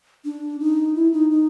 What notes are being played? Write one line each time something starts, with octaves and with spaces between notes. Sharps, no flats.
D4
D#4
E4
D#4
D#4